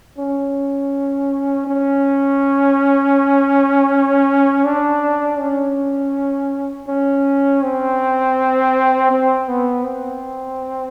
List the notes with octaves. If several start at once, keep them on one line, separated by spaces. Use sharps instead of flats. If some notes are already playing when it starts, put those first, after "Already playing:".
C#4
C#4
D4
C#4
C#4
C4
C4
B3
C4